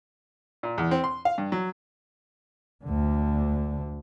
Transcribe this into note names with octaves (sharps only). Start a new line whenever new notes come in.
A#2
E2
C4
C6
F5
G2
F#3
D2 D3